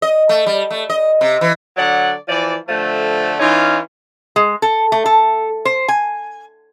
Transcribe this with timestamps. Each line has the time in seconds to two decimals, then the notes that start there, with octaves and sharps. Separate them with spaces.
0.02 D#5
0.29 A3
0.46 G3
0.71 A3
0.90 D#5
1.21 C3
1.41 E3
1.77 D3 F#3 D5 F#5
2.29 E3 F3 D5
2.68 D3 F3 A3
3.40 E3 C#4 D#4 F4
4.36 G#3
4.62 A4
4.92 A3
5.06 A4
5.65 C5
5.88 G#5